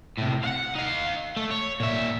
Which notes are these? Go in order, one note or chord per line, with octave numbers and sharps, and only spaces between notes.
A2 C3
F5 F#5
D#4 F5
A3
C#5
A#2 E5